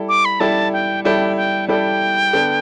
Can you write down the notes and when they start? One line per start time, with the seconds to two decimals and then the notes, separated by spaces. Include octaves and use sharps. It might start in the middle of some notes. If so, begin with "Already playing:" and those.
Already playing: G3 E4 A4 D5
0.09 D6
0.25 B5
0.40 G3 E4 A4 D5 A5
0.73 G5
1.04 G3 E4 A4 D5 G5
1.37 G5
1.68 G3 E4 A4 D5 G5
2.33 D3 B3 D4 A4